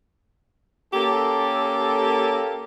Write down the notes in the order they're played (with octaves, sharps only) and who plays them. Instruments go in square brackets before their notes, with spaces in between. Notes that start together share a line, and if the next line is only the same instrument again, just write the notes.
[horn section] A#3 C#4 G4 A4